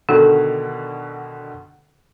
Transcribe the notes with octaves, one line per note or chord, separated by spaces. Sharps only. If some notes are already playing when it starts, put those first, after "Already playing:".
B2 D3 D#3 A4